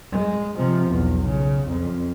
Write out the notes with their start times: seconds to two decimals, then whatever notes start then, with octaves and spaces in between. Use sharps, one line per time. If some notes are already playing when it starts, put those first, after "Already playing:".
0.12 G#3
0.58 C3 F3
0.90 B1 E2
1.27 C#3
1.68 F2